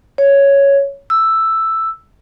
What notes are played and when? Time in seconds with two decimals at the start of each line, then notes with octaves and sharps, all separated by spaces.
0.18 C#5
1.10 E6